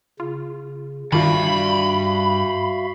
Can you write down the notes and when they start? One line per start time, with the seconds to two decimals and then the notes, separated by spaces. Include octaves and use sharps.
0.20 C#3 F4
1.12 G2 D#3 D4 F4 F#4 E5 F5 B5